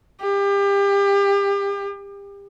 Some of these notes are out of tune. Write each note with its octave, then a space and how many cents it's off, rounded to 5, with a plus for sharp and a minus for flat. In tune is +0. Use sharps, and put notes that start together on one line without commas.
G4 +30